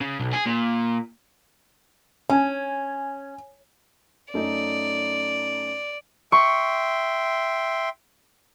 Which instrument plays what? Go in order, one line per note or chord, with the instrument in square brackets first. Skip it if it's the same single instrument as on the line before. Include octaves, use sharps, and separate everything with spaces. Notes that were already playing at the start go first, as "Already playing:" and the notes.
[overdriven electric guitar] C#3
B1
G#4
A#2
[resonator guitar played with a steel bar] C#4 [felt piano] G#5
[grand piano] F#2 A3 D#4 [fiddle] D5
[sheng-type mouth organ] E5 G5 C6 [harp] C#6